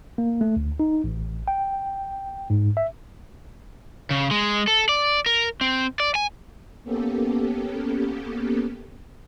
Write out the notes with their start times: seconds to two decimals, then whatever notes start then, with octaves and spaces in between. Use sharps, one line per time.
0.18 A#3
0.41 A3
0.56 D2
0.80 D#4
1.04 A1
1.48 G5
2.50 G#2
2.77 E5
4.11 C#3
4.31 G#3
4.67 A4
4.89 D5
5.26 A#4
5.61 C4
6.00 D5
6.15 G#5
6.84 A#3 B3 C#4 G4 A4